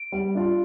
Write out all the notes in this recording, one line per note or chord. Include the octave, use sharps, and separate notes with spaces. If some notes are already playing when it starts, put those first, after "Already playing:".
Already playing: D7
G3
D4 F4